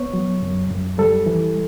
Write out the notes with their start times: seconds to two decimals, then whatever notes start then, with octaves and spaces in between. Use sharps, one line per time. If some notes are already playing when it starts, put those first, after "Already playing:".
Already playing: B3 C#5
0.14 F#3
0.42 F#2
0.70 F#2
0.98 G3 A4
1.26 E3